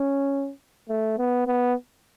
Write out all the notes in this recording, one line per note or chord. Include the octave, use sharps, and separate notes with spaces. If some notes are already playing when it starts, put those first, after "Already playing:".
Already playing: C#4
A3
B3
B3